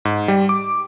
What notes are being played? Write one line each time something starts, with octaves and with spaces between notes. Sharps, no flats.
G#2
G3
D6